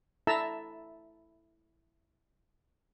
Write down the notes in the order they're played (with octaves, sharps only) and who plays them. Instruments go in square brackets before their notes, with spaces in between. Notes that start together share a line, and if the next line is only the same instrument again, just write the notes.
[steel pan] E4 A4 E5 A5 A#5 E6